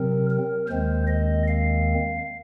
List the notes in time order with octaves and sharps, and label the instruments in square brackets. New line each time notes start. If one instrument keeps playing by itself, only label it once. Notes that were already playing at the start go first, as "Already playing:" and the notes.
Already playing: [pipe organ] C3 F#3 C4 A#4
A#4
D#2 D#3 G#3 C4 C5
D#5
F5